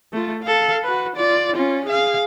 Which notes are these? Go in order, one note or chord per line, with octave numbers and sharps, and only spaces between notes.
A3 F4
A4 F5
F#4 B4
F4 D5
C#4 F4
G#4 F5